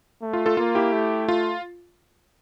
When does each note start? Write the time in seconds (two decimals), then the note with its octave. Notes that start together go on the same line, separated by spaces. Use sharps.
0.22 A3
0.33 F4
0.46 F4 A4
0.57 A#3 F4
0.75 E4 G4
0.93 A3
1.28 F4